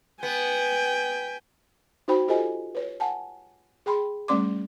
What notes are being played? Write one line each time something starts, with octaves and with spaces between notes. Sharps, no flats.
B3 G5 G#5
D#4 F#4 C5 G5 B5
F4 G4 A4 C5 D#5 G#5
B4 C#5
F#5 G#5 A5
G#4 G5 B5 C6
G3 A3 C#4 D5 C6 D6